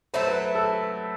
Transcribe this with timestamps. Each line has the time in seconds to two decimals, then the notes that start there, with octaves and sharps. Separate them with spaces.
0.14 F#3 A3 E4 C5
0.27 B4
0.42 B4
0.55 A4